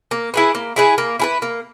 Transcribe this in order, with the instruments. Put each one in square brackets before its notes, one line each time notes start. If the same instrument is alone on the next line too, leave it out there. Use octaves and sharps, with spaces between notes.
[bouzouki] A#3
E4 G#4 B4
A#3
E4 G#4 B4
A#3
E4 G#4 B4
A#3